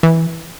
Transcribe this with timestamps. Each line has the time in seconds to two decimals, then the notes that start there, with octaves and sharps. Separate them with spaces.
0.03 E3